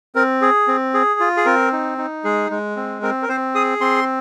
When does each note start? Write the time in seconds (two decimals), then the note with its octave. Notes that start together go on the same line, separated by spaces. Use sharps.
0.15 C4 A#4
0.42 G#4
0.68 C4
0.94 G#4
1.20 F4
1.37 G#4
1.46 C4 A#4
1.72 D#4
1.98 D#4
2.24 G#3 G#4
2.50 G#3
2.76 C4
3.02 C4 A#4
3.22 A#4
3.29 C4 C5
3.55 G#4 D#6
3.81 C4 C6